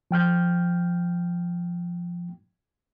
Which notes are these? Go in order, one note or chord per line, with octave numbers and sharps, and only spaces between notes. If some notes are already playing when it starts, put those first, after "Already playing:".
F3 G5 F6 G6